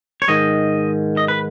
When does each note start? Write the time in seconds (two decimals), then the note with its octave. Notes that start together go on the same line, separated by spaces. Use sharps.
0.22 C#5
0.28 G#2 D#3 D#5
1.17 D#5
1.28 B4